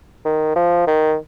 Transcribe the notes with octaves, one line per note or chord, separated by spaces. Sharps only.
D#3
F3
D#3